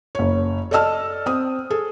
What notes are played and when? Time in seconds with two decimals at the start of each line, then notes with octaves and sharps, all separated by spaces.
0.15 F#1 C#5
0.71 A4 D5 D#5 A5 E6 F6
1.26 C4 D#6
1.70 G#4 A4